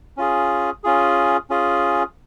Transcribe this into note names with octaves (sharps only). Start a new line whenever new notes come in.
C#4 F4 G#4
C#4 F4 G#4
C#4 F4 G#4